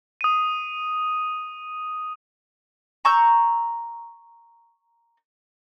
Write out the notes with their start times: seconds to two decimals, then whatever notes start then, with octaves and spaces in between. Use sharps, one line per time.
0.21 D#6 D#7
3.05 A#5 C#6 E6 G6